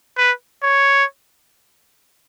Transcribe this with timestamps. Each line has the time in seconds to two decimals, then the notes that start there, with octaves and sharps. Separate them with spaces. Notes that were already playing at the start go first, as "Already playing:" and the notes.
0.18 B4
0.63 C#5